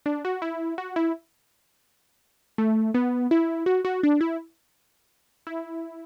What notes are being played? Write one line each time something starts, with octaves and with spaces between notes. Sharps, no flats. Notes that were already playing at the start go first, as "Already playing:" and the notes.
D4
F#4
E4
F#4
E4
A3
B3
E4
F#4
F#4
D4
E4
E4